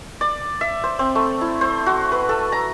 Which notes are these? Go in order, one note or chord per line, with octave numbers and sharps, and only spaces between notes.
D5
E5
C5
C4
A3
E4
C5
F#4
B4
A4
A#5